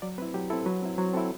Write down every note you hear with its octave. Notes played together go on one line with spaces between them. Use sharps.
F#3 D5
C4 E4 B4
F#3 G4
C4 E4 A4
F#3 B4
C4 E4
F#3 C5
C4 E4 A4